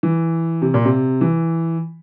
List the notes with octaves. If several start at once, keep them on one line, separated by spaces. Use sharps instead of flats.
E3
C3
A#2
C3
E3